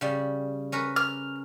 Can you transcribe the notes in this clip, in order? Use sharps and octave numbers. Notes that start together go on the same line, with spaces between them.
C#3 G3
C#4 A#4 B4
F6